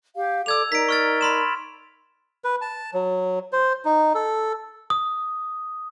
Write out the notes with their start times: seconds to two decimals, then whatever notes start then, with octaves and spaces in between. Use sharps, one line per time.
0.15 G4 F5
0.46 A4 D5 D6 E6 G#6 F7
0.72 D#4 A#4 D5 B6 D7
0.89 C#6 F6 A6
1.21 B5 C6 E7
2.44 B4
2.61 A5
2.94 F#3
3.53 C5
3.85 D#4
4.14 A4
4.90 D#6